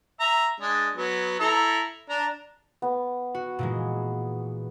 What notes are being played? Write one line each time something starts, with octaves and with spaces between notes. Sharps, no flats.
E5 A#5
G#3 D4
F#3 B3
E4 A4 A#5
D4 A#5
B3
F#4
A#2 E3 G#3